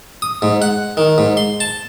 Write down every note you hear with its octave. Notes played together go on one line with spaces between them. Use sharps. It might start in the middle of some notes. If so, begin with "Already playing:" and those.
D#6
G#2
F#5
D#3
G#2
C6
A5